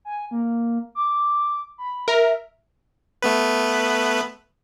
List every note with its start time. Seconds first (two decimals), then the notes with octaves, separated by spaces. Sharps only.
0.05 G#5
0.31 A#3
0.95 D6
1.78 B5
2.08 A#4 E5
3.22 A3 B3 B4